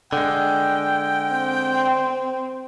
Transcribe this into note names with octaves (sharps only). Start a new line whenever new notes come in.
D3 G#3 G5
C4